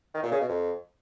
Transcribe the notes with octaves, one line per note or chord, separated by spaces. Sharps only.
D#3
A#2
C#3
B2
F2